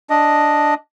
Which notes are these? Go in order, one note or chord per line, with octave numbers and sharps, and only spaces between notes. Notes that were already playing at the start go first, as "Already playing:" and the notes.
D4 D#5